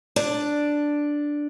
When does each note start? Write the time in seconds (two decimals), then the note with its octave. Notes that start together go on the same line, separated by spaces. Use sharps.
0.16 D4